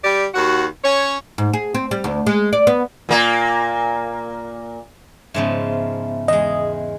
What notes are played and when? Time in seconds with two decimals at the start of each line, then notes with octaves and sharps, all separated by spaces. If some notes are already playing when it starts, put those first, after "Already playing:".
0.03 G3 G4 D5
0.33 D#2 F#4
0.83 C#4 C#5
1.38 G#2
1.54 G#4
1.75 C4
1.91 G3
2.04 D2
2.27 G#3
2.53 D5
2.67 B3
3.09 A#2 A#3
5.34 G#2 C#3 F3 B3 E5
6.28 E2 G#3 D#5